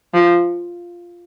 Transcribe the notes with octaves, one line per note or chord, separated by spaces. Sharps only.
F3